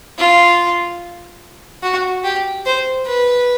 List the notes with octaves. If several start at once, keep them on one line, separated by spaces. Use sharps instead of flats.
F4
F#4
G4
C5
B4